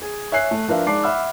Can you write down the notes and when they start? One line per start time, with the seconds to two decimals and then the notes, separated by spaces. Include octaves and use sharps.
0.02 G#4
0.32 C#5 E5 G#5 F#6 C7
0.51 A3
0.68 F3 D4 A#4 B4 E5 F5
0.86 G#3 D#4 D5 A5 D6 C7
1.03 E5 F#5 B5 E6 F6